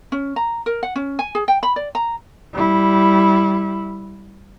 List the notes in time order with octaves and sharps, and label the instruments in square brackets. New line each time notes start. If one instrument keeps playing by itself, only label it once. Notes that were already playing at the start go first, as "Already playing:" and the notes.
[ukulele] C#4
A#5
A#4
F#5
C#4
G#5
G#4
G5
B5
D5
A#5
[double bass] G3 E4